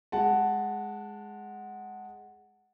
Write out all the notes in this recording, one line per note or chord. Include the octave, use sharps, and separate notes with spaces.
G#3 F#5 A5